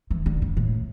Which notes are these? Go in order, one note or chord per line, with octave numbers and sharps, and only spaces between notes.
E3
D3
C#3
A2